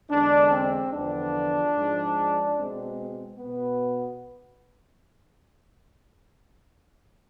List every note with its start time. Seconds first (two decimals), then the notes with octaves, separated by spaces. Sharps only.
0.10 E2 D3 G#3 D4
0.51 C4
0.92 E2 D3 F3 B3 D4
1.74 G#2 F3 G#3
2.58 B2 G#3 C4
3.39 B2 B3